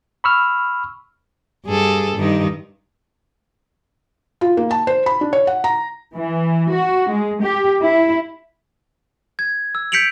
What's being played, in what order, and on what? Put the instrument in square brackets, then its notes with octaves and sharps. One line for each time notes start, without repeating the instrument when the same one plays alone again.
[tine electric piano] B5 C#6 E6 F6
[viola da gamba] G2 G#4 A4
G2 D#3 D#4
[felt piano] F4
A#3
A5
C5
B5
D4
C#5
F#5
A#5
[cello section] E3
F#4
G#3
G4
E4
[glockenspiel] G#6
E6
G6 B6 C#7 D7 F7 F#7